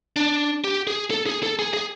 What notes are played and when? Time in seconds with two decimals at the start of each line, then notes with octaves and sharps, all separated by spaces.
0.16 D4
0.64 G4
0.87 G#4
1.11 A4
1.26 G#4
1.43 A4
1.59 G#4
1.74 G#4